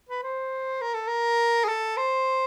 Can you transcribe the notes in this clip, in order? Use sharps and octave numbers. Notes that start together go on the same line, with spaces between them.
B4
C5
A#4
A4
A#4
G#4
A4
C5